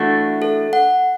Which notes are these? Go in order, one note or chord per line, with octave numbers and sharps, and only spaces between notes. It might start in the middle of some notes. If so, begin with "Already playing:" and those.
Already playing: E3 A3 D4 F#4
A4
F#5